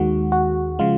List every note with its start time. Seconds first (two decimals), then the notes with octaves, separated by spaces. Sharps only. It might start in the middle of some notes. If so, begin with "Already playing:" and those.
Already playing: D#2 D#3 G#3 F#4
0.32 F#4
0.79 C#3 F3 G#3 F4